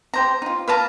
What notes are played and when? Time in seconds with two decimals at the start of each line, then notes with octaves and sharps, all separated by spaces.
0.14 G4 C5 A#5
0.42 D#4 F4
0.68 B4 F5 A5 A#5